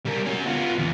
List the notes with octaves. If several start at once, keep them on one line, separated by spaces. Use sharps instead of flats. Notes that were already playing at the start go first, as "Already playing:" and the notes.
G3 A#4
C#4 F#4
B3 F4
E2